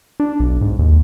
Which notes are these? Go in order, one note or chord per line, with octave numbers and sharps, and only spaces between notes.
D4
B1
G#2
D#2